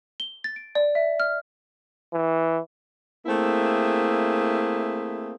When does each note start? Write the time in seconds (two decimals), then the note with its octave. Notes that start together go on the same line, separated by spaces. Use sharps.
0.20 G7
0.44 A6
0.56 D7
0.75 D5
0.95 E5
1.20 F6
2.13 E3
3.26 A3 A#3 C4 E4 G#4